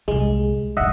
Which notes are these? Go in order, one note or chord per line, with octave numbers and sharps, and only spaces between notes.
C2 A#2 G#3
B1 G2 D#5 E5 F#5